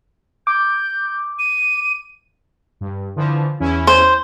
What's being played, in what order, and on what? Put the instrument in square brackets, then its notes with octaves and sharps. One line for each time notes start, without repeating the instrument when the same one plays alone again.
[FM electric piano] D6 [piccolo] G6
[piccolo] D#7
[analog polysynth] G2
D3 E3 F3
E2 C#4 E4
[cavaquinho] C5